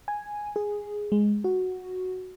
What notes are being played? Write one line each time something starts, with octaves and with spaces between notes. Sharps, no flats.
G#5
G#4
G#3
F#4